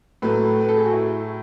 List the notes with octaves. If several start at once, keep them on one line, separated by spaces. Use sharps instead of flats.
A2 F#3 A3 B4
B4
A4
G#4
F#4
E4